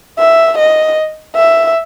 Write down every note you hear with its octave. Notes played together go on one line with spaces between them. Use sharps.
E5
D#5
E5